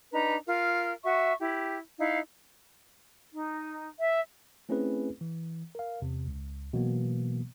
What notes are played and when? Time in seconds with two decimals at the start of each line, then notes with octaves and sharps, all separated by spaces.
0.13 D4 D#4 B4 A#5
0.47 F4 A#4
1.03 F#4 E5 C#6
1.40 E4 G4
1.99 D#4 E4 F5
3.32 D#4
3.99 E5
4.69 A3 C4 C#4 E4 G#4 B4
5.21 E3
5.75 A#4 F5
6.02 E2 C3
6.27 C#2
6.73 B2 E3 F#3 A#3 B3